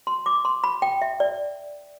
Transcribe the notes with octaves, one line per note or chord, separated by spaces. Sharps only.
C6
D6
C6
B5
G5
E5
D5